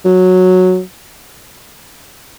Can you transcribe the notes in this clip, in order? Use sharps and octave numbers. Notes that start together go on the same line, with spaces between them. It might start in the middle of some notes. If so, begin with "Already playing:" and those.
F#3